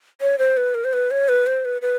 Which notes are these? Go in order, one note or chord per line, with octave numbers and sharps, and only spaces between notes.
C#5
C5
B4
A#4
C5
B4
C#5
B4
C5
B4
B4